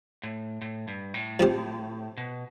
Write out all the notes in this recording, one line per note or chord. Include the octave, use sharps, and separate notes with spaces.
A2
A2
G2
A2
F3 C4 G4 C5
B2